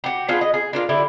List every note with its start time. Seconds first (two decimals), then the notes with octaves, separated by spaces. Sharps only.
0.04 F#4 G4
0.28 B3 D4 F4 G#4
0.41 D#5
0.54 G#4
0.73 D4 F4 A#4
0.89 D3 E4 G4